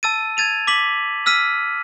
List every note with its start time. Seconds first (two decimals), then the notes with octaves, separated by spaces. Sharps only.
0.03 A5 E6 A6 D#7
0.37 G#6 A6 D#7 F7
0.67 D6 B6 F#7
1.26 E6 F6 B6 D#7